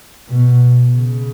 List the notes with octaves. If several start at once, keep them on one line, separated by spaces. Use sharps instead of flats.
B2
C#3